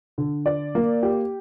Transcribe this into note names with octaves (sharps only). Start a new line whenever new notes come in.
D3
D5
A#3
G4